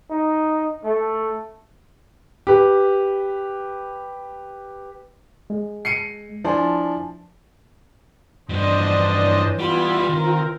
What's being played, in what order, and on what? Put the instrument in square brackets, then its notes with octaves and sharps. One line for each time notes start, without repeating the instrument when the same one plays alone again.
[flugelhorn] D#4
A3
[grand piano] G4 B4
[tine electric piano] G#3
[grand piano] C7 C#7 D#7
[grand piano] F3 D4 C6 [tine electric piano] E4 G#5 A5
[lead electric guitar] G2 F3 [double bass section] E3 [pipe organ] D4 C5 D#5
[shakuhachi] C#5
[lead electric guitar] G3 B5 [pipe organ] B3 E4 [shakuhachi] F4
[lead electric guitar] D#3 [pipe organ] C4 A#4